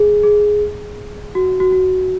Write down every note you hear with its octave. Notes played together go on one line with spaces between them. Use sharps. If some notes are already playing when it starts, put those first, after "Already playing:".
Already playing: G#4
G#4
F#4
F#4
F#4